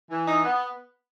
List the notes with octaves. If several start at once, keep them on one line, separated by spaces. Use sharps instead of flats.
E3
D#4
B3